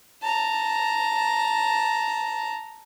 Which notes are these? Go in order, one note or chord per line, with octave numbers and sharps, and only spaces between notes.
A5 A#5